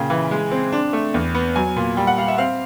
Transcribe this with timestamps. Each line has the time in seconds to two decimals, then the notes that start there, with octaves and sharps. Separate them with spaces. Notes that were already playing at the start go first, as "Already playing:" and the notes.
Already playing: A#2 C#3 G5
0.10 E3
0.31 G#3
0.52 C4
0.72 D4
0.93 A3
1.14 E2
1.34 B3
1.56 F#3 G#5
1.77 A#2
1.97 G3 G5
2.07 F#5
2.18 G3 F5
2.28 E5
2.38 C4 F5